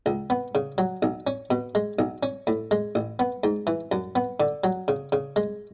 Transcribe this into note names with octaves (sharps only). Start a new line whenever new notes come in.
C#2
B3
C#3
F#3
B1
C#4
B2
G#3
B1
C#4
A2
G#3
A1
B3
G#2
E3
F#2
B3
D3
F#3
C#3
C#3
G#3